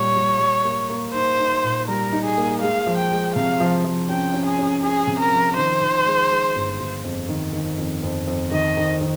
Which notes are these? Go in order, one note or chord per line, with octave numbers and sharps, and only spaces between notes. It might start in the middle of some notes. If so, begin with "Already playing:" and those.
Already playing: A#2 G3 C#5
G3
G3
A#3
A#3
D#4 C5
D#4
A#2
G3 A#4
D#4
G#4
A#3
G#3 F5
F3
G5
G#3
C3 F5
F3
F3
C#4 G5
C#4
G#4
C#4
C#4 G#4
C3
A#4
F3
D#3 C5
D#3
G#3
G#3
G1
G1
F2
D#3
D#3
F2
F2
F2
D#3 D#5
D#3
D#3